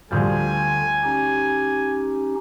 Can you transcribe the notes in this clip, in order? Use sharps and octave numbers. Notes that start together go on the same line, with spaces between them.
D2 D3 F3 G3 G#5
C#4 D#4 G4